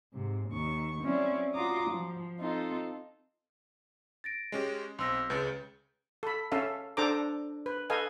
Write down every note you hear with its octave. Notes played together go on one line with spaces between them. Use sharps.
G#2 C3
D#2 D#3 C#6
F#3 C4 C#4 E4 D5
F4 F#4 A#5 D6 D#6
F3
C4 D#4 F4 A4
A6 A#6 D7
G#3 C#4 G4
B1 C4 C6 E6 A#6
C#2 C#3 B4 G6 A6
A4 B5
C#4 A4 E5 F5
D4 A4 C5 A#5 D6
B4
A4 B4 D#5 F5 G#5